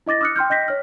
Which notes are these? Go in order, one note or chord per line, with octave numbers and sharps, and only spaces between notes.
E4 D#5 D6 A6 A#6
D6 D#6 F6 F#6 C#7
G5 C6 F6 G6
D#5 G6 A#6 B6
C#5 F6